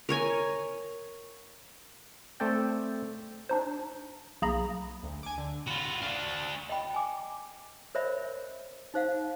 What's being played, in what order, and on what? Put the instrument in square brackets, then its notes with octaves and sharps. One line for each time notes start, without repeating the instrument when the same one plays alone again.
[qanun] A#4 C#5 G#5
[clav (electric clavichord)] A3 C4 A4 D5 G5
[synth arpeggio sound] D4 D#4 C5
B1 A#3 G#4 A#5 B5 A#6
[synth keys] D2
G#5 D6
D3
[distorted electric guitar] F4 F#4 [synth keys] B5
[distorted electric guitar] D4 F#4 [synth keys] F5
[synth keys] A5
[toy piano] D#5 G5 B5
G#5 D6
A#4 C5 C#5 D#5 E5 B5
D#4 C5 F5 F#5